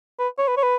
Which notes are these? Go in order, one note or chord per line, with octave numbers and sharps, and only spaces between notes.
B4
C#5
B4
C#5
B4